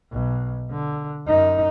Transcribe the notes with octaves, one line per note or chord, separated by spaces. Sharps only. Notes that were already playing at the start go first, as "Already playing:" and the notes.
B1
D3
F#2 D#4